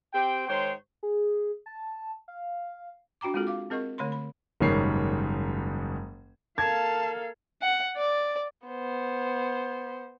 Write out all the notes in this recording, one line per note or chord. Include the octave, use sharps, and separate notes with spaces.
C4 G4 C5 G5
G#2 D#3 C5 C#5 G5 C6
G#4
A5
F5
D4 F#4 G5 A#5 D6
G#3 C4 F4 F#4 G#4 A4
F5 D6
C4 G#4 A#4 D#5 F#5 C#6
D3 A3 C#5 B5 C6
B5
F#1 G#2 D#3 G3 C#5 C7
A#3 A4 F5 A5 G#6
F#5
D5
B3 C5